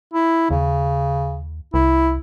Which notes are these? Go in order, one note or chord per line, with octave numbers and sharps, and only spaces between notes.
E4
D#2 C#3
C2 E4